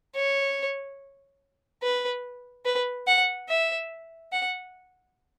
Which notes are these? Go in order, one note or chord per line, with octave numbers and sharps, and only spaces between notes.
C#5
B4
B4
F#5
E5
F#5